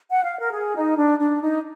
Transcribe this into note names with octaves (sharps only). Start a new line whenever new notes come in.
F#5
F5
A#4
G#4
D#4
D4
D4
D#4